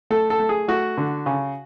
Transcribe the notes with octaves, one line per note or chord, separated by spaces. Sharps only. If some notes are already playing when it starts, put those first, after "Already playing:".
A3 A4
A4
A3
G#4
A3 F#4
D3
C#3